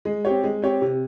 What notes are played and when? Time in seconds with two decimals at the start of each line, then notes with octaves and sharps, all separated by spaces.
0.05 G#3
0.25 C4 G4 C#5
0.44 G#3
0.62 C4 G4 C#5
0.81 C3